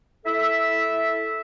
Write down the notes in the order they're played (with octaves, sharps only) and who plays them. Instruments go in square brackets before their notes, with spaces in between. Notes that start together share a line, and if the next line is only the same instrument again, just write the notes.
[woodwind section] E4 A4 E5